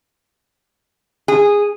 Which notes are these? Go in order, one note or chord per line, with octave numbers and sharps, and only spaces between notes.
G#4